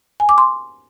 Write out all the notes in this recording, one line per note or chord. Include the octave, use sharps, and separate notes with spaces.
G#5
D6
C6